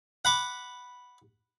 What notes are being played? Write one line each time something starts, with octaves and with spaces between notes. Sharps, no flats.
F#5 B5 D6